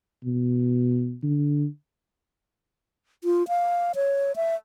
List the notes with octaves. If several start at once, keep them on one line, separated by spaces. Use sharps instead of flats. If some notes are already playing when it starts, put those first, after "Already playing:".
B2
D3
F4
F5
C#5
E5